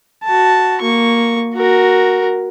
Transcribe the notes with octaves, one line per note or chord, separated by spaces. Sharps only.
F#4 A5
A#3 C#6
F#4 A#4